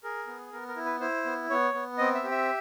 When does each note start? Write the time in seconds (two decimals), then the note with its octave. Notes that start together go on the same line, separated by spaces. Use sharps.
0.04 G#4 A#4
0.27 B3
0.52 B3 A#4
0.68 A#4
0.76 E4
0.85 B4
1.00 E4 C5
1.25 B3
1.50 B3 C#5
1.74 B3
1.98 C4 D#5
2.15 E5
2.23 G4
2.31 E5